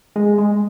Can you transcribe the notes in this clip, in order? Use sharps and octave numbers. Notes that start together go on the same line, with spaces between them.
G#3
G#3